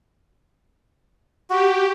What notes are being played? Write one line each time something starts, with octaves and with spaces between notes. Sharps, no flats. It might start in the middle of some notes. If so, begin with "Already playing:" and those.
F#4 G4